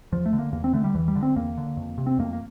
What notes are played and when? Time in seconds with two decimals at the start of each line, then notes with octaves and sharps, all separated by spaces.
0.12 E2 F3
0.26 A3
0.33 D3
0.39 A#3
0.52 E2 A#3
0.64 C4
0.73 D3 A3
0.84 G3
0.94 E2 E3
1.08 G3
1.15 D3
1.23 C4
1.36 E2 A#3
1.57 D3
1.77 F2
1.98 C3
2.06 C4
2.18 F2 A#3
2.33 A#3